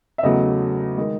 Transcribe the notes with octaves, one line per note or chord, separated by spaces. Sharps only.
E5
E2 C#3 F#3 A3 D#5
D#3 G#3